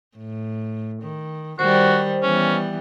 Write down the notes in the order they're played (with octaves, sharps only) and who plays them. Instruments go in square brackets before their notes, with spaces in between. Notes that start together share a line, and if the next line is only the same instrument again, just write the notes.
[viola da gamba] A2
D#3
[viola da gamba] D#3 G3 [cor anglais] F#4 [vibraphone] C5
[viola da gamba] E3 G3 B3 [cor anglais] C#4